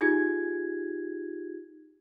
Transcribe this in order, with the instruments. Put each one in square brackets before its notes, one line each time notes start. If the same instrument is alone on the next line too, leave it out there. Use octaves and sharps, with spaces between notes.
[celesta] D#4 F4 G4 G#4 G#6